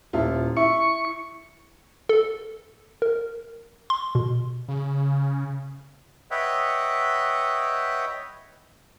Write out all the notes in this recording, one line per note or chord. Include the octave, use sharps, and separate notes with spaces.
D#1 E4 F4
E4 C#6
A4
A#4
C6
B2
C#3
B4 C#5 D#5 E5 F#5 G5